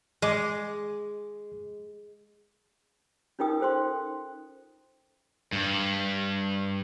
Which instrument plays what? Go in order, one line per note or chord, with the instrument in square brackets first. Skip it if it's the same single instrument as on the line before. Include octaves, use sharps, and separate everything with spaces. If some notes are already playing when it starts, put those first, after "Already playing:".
[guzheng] G#3 [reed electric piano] G#4 D#5 D6
[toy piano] C#4 D#4 F4 A#4 G5 D#6
F4 A4 C5 G5 C6
[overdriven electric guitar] G2